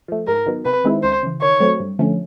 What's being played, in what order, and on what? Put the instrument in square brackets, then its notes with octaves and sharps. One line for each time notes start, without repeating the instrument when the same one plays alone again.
[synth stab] F3 A3
[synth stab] G#2 [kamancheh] A#4
[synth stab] D#3 F#3 B3
[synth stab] C3 [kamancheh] B4
[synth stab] D#3 G#3 C4 E4
[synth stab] C#2 [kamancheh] C5
[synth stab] C#3 E3
[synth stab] D#3 [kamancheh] C#5
[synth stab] F#3 A3 C4
G2
D3 F3 A3 C#4